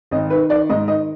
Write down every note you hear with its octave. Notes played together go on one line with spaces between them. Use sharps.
G#1 D#5
D#3 B4
D#3 D5
G#2 D#5
D#3 D#5